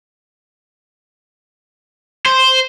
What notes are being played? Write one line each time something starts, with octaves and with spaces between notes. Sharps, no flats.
C5